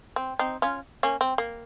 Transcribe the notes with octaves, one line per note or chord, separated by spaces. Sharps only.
C4
C4 D#4
C#4 F4
A#3 C#4
C4
A#3